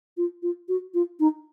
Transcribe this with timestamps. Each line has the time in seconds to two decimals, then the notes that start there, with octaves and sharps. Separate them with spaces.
0.17 F4
0.43 F4
0.69 F#4
0.94 F4
1.20 D#4